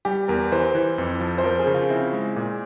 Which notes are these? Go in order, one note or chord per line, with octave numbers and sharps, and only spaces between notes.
G3 G4
E2 A#4
E3 C5
E3
F2
F3
C5
F3 A#4
G#4
C#3
F4
C4 E4
G#3
A#2